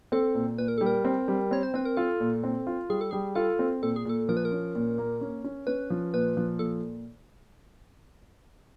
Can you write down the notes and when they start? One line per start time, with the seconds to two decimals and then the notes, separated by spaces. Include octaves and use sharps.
0.12 C4 A4
0.35 A#2
0.58 A#2 B4
0.68 A#4
0.78 G3 A4
0.86 A#4
1.05 C4
1.28 G3
1.51 C4 C#5
1.63 C5
1.74 C4 B4
1.85 A#4
1.97 F4 A4
2.20 A#2
2.44 C4
2.67 F4
2.90 G3 G#4
3.01 A4
3.11 G3 G#4
3.35 F4 A4
3.59 C4
3.82 A#2 A4
3.96 G#4
4.05 A#2 A4
4.29 F3 A#4
4.37 B4
4.45 A#4
4.52 C#4
4.75 A#2
4.98 A#3
5.21 C#4
5.44 C#4
5.67 C#4 B4
5.90 F3
6.14 A#2 B4
6.37 F3
6.59 A#2 A4